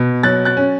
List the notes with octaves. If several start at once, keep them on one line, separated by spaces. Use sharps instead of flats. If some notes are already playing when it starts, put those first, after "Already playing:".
Already playing: B2
F#3 F#6 A6
F#6 A6
C#4